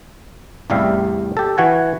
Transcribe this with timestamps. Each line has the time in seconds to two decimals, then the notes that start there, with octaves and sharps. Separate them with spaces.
0.70 A1 E2 C3 G3 E5 F5
1.37 G4 A4
1.58 E3 F#4 F#5 G#5